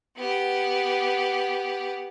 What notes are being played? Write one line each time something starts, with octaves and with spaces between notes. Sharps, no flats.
B3 G4